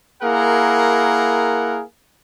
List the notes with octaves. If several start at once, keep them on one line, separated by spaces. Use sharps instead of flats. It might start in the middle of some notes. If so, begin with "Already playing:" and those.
A#3 E4 G#4 A#4 F#5